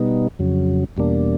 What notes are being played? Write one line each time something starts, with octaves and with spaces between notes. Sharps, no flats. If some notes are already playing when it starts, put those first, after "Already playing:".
Already playing: B2 G3 B3 D#4
F2 C#3 F#3
E2 B2 G3 A#3 D4